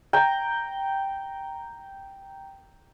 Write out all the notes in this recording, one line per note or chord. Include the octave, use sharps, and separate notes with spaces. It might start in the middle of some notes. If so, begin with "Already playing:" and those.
G5 A#5